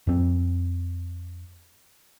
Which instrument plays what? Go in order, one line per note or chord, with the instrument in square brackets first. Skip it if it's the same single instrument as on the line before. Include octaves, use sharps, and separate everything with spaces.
[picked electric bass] F2 C4